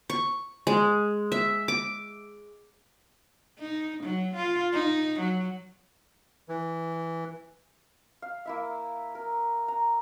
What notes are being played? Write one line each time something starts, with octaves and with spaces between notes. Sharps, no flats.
C#6
G#3
E5
D6
D#4
F#3
F4
D#4
F#3
E3
F5
A#3 E4 E5
A#4
A#5